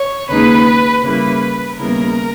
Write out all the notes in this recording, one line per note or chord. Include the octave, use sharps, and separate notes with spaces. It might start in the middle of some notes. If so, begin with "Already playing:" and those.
Already playing: C#5
D#2 C#3 G#3 D#4 B4
C#3 G3 A#3 E4 B4
D#2 C#3 G3 B3 E4 A#4